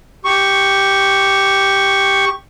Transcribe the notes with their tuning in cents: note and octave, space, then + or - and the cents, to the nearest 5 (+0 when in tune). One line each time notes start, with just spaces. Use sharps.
G4 +0 C#6 +5